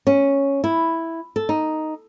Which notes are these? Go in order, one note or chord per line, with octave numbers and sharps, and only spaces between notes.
C#4
E4
A4
D#4